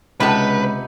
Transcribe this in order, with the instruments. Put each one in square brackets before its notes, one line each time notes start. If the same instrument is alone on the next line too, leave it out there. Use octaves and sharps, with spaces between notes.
[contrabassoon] C#2 [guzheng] C3 B3 D#4 [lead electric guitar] B4 [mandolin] A5 B5